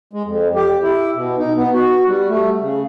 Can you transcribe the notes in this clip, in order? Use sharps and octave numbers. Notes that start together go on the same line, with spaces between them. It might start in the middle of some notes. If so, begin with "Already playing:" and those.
G#3
F2
G4
E4
B2
D#4
B3
F#4
G3
A3
C#3